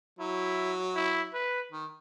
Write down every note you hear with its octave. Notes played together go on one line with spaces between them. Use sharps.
F#3 E4
E4
B4
D#3